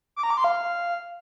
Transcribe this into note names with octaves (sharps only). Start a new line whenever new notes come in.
D6
A#5
D6
C6
F5